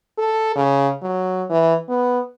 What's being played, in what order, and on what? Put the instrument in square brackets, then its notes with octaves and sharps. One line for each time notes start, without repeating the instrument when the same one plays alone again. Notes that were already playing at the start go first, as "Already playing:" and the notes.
[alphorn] A4
C#3
F#3
E3
B3